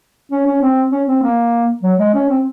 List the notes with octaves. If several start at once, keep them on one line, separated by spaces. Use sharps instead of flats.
C#4
C#4
C4
C#4
C4
A#3
F#3
G#3
C#4
C4